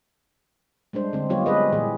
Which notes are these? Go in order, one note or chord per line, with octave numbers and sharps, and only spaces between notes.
G3 G#3 D4 C5
D3 C4
F#3 G3 B3 F4 G4 C#5
G#3 C4 G#4 B4 D#5
A#2 E3 G#4